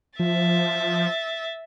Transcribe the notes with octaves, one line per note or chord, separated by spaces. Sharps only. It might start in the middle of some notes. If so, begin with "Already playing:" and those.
F3 E5 A6